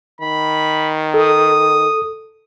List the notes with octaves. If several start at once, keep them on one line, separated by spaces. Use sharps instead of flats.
D#3 B5
A4 D#6